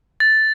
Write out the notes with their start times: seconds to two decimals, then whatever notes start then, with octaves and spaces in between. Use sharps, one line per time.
0.20 A6